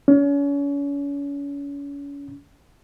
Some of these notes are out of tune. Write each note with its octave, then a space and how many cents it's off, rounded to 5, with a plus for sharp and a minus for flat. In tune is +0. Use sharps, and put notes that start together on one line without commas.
C#4 +35